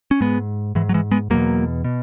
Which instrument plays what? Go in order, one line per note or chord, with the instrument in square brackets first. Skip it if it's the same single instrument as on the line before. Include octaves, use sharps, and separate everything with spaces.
[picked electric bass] C#4
G#2 G#3 B3
G#2 E3
F#3
E3 G#3
G#3 B3
E2 B2 F#3 A#3
B2